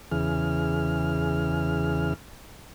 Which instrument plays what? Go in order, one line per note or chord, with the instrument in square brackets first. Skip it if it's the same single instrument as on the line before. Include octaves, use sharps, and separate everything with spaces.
[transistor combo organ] E2 C#3 E3 G#4 F6